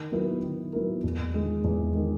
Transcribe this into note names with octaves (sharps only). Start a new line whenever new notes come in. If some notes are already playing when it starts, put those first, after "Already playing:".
Already playing: D#3
F#3 B3 E4 A#4
D#3
F#3 B3 E4 A#4
E2
D#3 G#3
E2
D#3 G#3